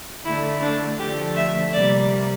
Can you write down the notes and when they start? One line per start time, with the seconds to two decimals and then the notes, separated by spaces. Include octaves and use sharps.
0.24 D3 A3 E4
0.61 D4
0.98 D3 F3 A3 G4
1.35 E5
1.72 C3 G3 A#3 D5